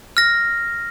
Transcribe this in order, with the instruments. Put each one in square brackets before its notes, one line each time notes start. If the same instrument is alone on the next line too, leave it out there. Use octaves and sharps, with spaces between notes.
[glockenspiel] F6 A#6